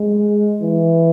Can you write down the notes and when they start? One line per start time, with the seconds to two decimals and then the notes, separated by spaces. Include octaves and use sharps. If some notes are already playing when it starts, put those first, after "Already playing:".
Already playing: G#3
0.62 E3